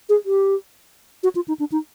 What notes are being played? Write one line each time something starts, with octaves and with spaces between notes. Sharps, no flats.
G#4
G4
F#4
F4
D#4
D4
D#4